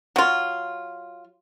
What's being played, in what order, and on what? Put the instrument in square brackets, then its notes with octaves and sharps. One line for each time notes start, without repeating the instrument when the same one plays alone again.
[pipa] F#3 F4